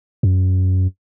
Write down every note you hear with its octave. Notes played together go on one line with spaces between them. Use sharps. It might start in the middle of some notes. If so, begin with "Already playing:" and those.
F#2